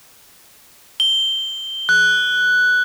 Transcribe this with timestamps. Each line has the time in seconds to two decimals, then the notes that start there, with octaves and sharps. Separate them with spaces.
1.00 G7
1.89 F#6